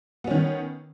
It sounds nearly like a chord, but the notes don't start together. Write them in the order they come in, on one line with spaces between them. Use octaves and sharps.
B3 C#4 D#3